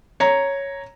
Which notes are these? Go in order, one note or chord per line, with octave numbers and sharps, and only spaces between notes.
C#5 A#5